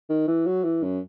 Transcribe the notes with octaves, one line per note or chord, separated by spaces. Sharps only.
D#3
E3
F#3
E3
F#2